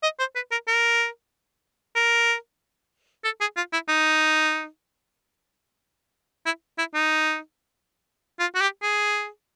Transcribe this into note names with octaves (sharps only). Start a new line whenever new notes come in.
D#5
C5
B4
A#4
A#4
A#4
A4
G#4
F4
E4
D#4
E4
E4
D#4
F4
F#4
G4
G#4